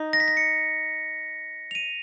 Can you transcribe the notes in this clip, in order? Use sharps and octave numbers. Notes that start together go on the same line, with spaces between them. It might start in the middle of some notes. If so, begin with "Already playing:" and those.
Already playing: D#4
A#6
B6
A#6
C#7
F7
D#7